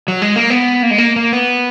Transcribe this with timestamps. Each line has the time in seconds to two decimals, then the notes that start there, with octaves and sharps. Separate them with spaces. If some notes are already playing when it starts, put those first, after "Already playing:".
0.08 F#3
0.22 G#3
0.36 A#3
0.50 B3
0.83 A#3
0.91 G#3
0.98 A#3
1.16 A#3
1.33 B3